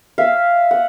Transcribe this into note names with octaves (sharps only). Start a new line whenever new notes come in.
E5 F5
F#5